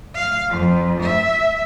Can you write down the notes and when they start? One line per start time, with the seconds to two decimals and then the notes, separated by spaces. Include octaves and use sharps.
0.15 F5
0.50 F2
1.03 E5